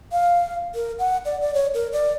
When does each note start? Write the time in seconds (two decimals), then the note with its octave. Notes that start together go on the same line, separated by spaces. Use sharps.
0.12 F5
0.75 A#4
0.99 F#5
1.25 D5
1.41 D5
1.54 C#5
1.74 A#4
1.92 D5